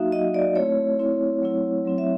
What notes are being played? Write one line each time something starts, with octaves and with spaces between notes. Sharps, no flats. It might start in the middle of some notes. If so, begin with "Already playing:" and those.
Already playing: F#3 A#3 D#4 F#4 E5 F5
F#3 A#3 D#4 F#4 D#5
D5
A3 C4 E4 C#5
A3 C4 E4
F#3 A3 C4 E4
F#3 A3 C4 E4
E5